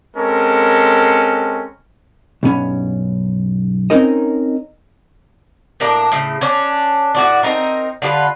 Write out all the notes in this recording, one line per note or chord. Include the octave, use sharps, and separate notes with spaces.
G#3 C4 C#4 A4 A#4
B1 G2 B3 C#4
C4 C#4 D#4 A#4 D#5
A2 A#3 D4 A#4
A2 C#3
C#4 D4 C#5
A2 F#4 D5
C4 D#4 A#4
D3 F4 G4 B4